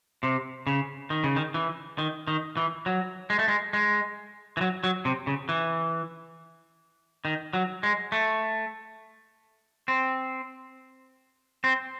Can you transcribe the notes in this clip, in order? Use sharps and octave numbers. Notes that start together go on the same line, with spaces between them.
C3
C#3
D#3
C#3
D#3
E3
D#3
D#3
E3
F#3
G#3
A3
G#3
G#3
E3
F#3
F#3
C3
C#3
E3
D#3
F#3
G#3
A3
C4
C4